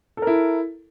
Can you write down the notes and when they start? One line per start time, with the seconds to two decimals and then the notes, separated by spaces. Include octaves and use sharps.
0.17 A4
0.22 A#4
0.27 E4